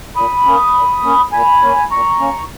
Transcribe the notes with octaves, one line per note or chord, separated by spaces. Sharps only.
A#2 B5 D#6
A#3 C#4
A#2
A#3 C#4
A#2 G#5 B5
A#3 C#4
A#2 A#5 C#6
A#3 C#4